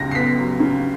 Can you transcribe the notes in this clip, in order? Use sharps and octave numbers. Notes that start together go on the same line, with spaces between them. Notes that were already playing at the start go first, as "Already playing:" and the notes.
Already playing: C#2 C#3 F#3 A#6
C7
B3 B6
F#3
C#3